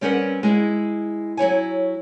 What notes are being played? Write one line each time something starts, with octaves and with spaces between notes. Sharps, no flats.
G3 C4 C#4 A#4 B4 F#5
G#3 E4
F#3 E4 C#5 G#5